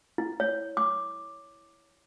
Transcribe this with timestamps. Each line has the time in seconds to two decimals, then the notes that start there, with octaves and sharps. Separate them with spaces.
0.18 E4
0.40 C#5
0.77 D6